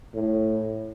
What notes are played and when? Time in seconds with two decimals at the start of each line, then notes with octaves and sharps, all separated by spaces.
0.14 A2